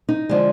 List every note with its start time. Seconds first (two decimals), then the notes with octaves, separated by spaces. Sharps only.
0.09 D#4
0.29 D3 F3 G#3